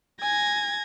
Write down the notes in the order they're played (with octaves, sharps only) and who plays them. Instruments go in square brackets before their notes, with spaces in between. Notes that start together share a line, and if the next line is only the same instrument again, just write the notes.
[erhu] G#5 [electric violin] G#6 A#6